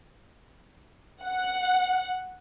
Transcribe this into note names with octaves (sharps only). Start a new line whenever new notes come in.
F#5